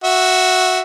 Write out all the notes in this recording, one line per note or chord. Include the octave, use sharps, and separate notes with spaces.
F#4 E5